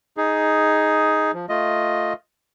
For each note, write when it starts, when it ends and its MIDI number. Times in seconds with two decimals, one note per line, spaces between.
0.17 1.31 63
0.17 1.31 68
1.34 1.46 53
1.49 2.13 57
1.49 2.13 65
1.49 2.13 75